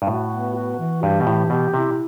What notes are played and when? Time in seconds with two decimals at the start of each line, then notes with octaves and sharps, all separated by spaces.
0.02 G2
0.07 A2 F#4
0.32 B3
0.55 F#4
0.79 E3
1.03 G2 G4
1.20 B2
1.26 A2 E3
1.50 B2 G4
1.74 C3 E4